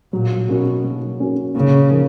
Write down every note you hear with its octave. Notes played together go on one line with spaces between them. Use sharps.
A#2 F#3
B2 A#3 C#4 F#4
F#3
A#3 C#4 F#4
A#2 C#3
F3 A#3